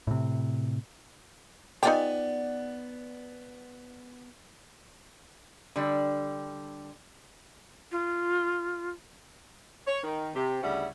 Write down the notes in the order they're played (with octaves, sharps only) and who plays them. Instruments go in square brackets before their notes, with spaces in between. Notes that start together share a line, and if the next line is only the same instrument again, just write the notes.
[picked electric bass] A2 C3
[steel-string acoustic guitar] B3 D5 G#5 [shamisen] D#4 F4 G4
[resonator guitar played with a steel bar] D3 G3
[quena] F4
[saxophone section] C#5
D#3
C3 G4
D2 C#3 G3 E4 E5 F#5